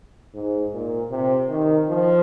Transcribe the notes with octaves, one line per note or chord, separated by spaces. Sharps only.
G#2
A#2
C3
D#3
F3